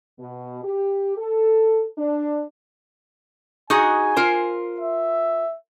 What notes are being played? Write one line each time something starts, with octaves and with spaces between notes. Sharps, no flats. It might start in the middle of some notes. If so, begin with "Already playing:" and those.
B2
G4
A4
D4
D#4 F#4 G#4 G#5
F4 A#4 C5
E5